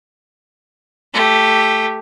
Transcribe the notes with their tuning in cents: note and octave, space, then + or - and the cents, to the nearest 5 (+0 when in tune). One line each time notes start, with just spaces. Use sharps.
A3 +0 G4 +0